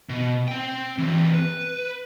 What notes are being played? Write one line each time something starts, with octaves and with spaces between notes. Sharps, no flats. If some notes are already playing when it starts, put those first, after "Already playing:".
B2
C4 G5
E3 C4
B4